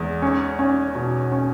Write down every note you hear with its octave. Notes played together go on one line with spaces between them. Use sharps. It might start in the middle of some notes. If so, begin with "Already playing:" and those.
Already playing: E2 G#3
C#4
C#4
B2
C#4